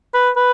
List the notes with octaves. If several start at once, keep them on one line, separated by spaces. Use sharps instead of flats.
B4
B4